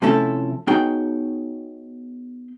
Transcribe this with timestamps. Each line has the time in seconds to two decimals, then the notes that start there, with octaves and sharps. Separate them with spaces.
0.02 C3 F3 A3 C#4 E4 A4
0.67 B3 D#4 F#4 G#4 C#5 G5